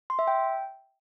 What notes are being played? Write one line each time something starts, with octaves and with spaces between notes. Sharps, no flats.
C6
E5
G5